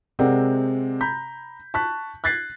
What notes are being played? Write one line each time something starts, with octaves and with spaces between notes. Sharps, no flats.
C3 G#3 C4 A#4 D5 F#5
A#5 B5 G6 B6
A5 C#6 F#6 B6
F#6 G#6 A6 B6 C7